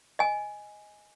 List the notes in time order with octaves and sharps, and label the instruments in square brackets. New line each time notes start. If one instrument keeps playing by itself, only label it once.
[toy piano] D#5 G#5